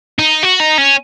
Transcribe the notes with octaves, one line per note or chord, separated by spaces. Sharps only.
D#4
F#4
D#4
C#4